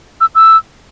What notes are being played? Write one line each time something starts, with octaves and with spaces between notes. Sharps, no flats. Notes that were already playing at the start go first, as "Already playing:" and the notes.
E6
E6